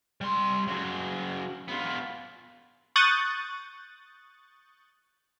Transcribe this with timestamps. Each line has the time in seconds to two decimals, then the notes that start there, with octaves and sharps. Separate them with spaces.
0.21 G3 C6
0.67 C#3 F#3
1.69 B3 F4
2.96 C#6 D#6 F#6 G6 A6